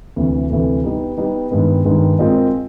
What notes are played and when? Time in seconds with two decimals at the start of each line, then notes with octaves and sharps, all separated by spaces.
0.16 D2 C3 E3 A3
0.50 D2 C3 E3 A3
0.84 G3 B3 D#4
1.17 G3 B3 D#4
1.51 G2 D#3 G#3 B3
1.85 G2 D#3 G#3 B3
2.19 G#3 C4 F4 A#4 D#5